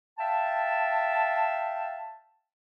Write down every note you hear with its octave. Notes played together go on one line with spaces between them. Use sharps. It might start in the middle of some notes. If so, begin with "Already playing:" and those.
E5 F5 G5 A5